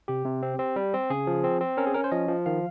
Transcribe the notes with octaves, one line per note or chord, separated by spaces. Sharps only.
C3 G4
C3
C4
C4
G3
C4
C#3 G#4
F3
C4
C4
C#4 A#4
G#4
C#4 A#4
C5
F3 D#5
F3
D#3 F5